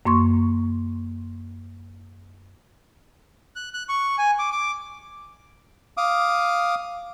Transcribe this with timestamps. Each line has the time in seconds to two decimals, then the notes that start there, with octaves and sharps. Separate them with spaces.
0.05 F#2 A#3 C6 C#6
3.56 F#6
3.74 F#6
3.89 C#6
4.18 G#5
4.39 D6
4.52 D6
5.97 F5 D6 D#6